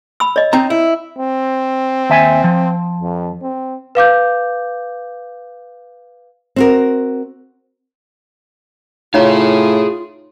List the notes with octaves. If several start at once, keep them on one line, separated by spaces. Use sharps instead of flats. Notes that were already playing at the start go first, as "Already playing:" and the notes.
B5 E6
C#5 D#5
C4 D#4 A#5
E4
C4
D#2 E5 G#5
F3
F2
C4
B4 F5 D6 G6
C4 F#4 A#4
A2 D#4 F4 G#4 C#5 F5 A#5